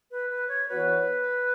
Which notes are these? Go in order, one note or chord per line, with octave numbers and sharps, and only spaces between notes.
B4
B4
C#5
E3 B3 F#4 B4 C#5